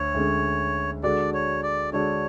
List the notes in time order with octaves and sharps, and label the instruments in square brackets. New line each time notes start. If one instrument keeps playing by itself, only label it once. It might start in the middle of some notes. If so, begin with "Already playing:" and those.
Already playing: [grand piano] D2 [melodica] C#5
[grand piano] D2 D3 G#3 C#4
[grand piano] D3 G#3 D4 F#4 A4 [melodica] D5
[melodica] C#5
D5
[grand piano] D3 G#3 D4 F#4 A4 [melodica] C#5